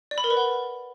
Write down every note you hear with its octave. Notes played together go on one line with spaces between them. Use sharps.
D5
B5
A#4
B4
F#5